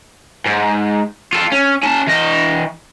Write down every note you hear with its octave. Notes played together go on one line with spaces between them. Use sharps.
G#2
F4 A4
C#4
C#4 A5
E3 D#5